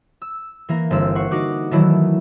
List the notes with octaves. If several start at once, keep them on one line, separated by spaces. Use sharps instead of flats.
E6
E3 A#3 A#4
G1 C4 E6
F#5 C#6 C7
D#4 F#4 D6 F#6
D#3 E3 F#3 A3 E4